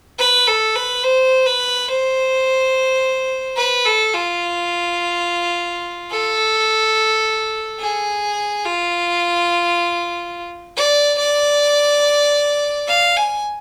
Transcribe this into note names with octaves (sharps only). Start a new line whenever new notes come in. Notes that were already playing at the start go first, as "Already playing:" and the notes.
B4
A4
B4
C5
B4
C5
B4
A4
F4
A4
G#4
F4
D5
D5
F5
G#5